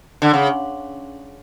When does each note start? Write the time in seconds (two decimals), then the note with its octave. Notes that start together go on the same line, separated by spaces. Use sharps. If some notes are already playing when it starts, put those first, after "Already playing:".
0.22 D3
0.33 C#3